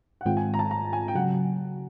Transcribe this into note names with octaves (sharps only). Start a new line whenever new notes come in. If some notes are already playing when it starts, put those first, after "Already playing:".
F#5
G#2 D#3 G#3 C4 F4 G5
G#5
A#5
A5
A#5
G#5
G5
C#3 F#3 F#5